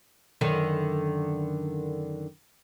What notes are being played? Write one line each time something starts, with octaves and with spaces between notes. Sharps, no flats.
F#2 D3 D#3